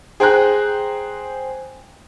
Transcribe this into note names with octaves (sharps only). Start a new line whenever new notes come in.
G#4 C5 G5 G#5 A#5 F#6